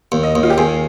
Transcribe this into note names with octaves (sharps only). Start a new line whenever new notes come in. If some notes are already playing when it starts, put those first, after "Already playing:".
D#2
D#5
D#2
F4
G4
D#2 G#4